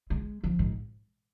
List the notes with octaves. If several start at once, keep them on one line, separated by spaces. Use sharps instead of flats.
G#3
F3
G#2